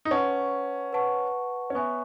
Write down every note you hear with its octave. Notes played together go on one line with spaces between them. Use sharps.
D#4
C#4 B4 F#5 A5 C#6
B4 F#5 A5 C#6
C#4
B3 C#5 E5 G#5 C#6